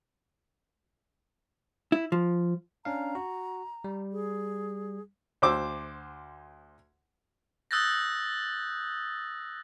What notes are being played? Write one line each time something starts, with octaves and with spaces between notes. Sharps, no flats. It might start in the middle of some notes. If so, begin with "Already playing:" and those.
E4
F3
C#4 D4 F5 A#5
F#4
G3
G#4
D2 C5 D6 E6
D#6 E6 F#6 G6 A6 A#6